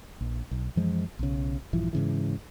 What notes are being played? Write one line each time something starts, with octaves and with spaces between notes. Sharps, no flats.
A#1
B1
F#2 E3 F3 G#3
B1 C#3
A#1 G2 E3 F3
G#2 C#3 E3